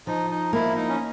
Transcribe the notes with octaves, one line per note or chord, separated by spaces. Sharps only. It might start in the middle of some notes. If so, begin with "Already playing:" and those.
F3 D#4
D#4
A#3 E4
D#4
C#4